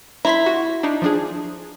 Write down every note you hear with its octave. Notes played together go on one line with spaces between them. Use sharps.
E4 A#5 C6 B6
F#4
D4 D#4
F3 D4 G#4